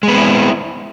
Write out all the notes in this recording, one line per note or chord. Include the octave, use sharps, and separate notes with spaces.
G#3 B3 C4 E4